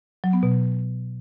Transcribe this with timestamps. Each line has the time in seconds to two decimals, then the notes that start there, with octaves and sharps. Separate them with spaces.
0.24 F#3
0.33 B3
0.43 B2